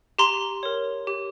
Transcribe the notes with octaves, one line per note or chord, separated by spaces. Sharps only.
G4 A#5 C6
A#4 C#5
G4